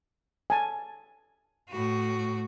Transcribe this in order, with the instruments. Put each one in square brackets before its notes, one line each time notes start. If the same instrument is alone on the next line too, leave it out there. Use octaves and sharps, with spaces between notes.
[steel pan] G#5 A5
[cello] A2 F#4